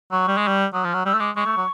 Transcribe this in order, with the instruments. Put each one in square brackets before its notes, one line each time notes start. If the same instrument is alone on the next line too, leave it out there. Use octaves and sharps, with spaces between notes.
[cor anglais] F#3 [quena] C#6
[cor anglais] G3
G#3
G3
[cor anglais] F#3 [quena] D#6
[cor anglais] F3
[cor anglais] F#3 [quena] F6
[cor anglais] G3 [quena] E6
[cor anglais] A3
[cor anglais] G#3 [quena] D6
[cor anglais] G#3 [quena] C#6
[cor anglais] A3
F#3